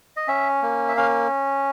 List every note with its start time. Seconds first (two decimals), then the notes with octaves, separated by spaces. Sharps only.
0.17 D#5
0.28 C#4 E5
0.62 A#3
0.88 E5
0.97 C#4 F5